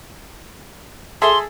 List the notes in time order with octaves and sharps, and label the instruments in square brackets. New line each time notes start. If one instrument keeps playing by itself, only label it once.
[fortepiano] G#4 A4 E5 [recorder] C6